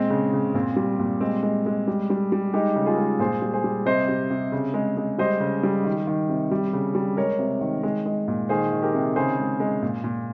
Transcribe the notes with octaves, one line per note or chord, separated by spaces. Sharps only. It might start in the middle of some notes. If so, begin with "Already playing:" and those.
Already playing: A#2 G#3 C4
C#3
C#3
A#2 C4
G3
A#2
G#3 C4
G#3
G#3
G3
G3
G3
G#3 D#4 G4
C#3
F4 G#4
G#3
A#2 G#4 C5
G3
G#4 C5
G3
C3 C5 D#5
C3
C3
C#3
G#3
G#3
G3 C5 D#5
C#3
G3
D#3
D#3
C3
G3
C#3
G3
G#3 A#4 C#5
C3
D#3
G#3
G#3
A#2
D#3 G#4 C5
D#3
G4 A#4
C3
C#3 G#4 C5
G#3
G#3
A#2
A#2